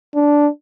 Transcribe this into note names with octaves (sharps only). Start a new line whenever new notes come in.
D4